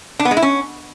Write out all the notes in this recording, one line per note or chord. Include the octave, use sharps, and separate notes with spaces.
D4
B3
G#3
E4
C#4